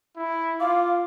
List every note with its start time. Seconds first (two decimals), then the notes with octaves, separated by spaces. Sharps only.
0.16 E4
0.60 F4 F5 D6